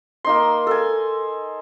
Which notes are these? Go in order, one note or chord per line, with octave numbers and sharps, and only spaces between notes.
A#3 D#4 C6
A4 G#5